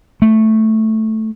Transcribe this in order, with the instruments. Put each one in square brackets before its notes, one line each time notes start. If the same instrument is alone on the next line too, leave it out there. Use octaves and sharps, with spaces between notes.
[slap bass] A3